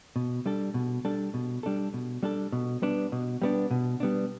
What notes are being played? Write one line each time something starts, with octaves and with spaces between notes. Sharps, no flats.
B2
G3 D4 A4
B2
G3 D4 A4
B2
G3 D4 A4
B2
G3 D4 A4
B2
G3 B3 D4
B2
G3 B3 D4
B2
G3 B3 D4